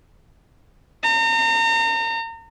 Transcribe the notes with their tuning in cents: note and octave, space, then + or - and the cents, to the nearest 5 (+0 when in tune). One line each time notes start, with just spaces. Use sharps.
A#5 -35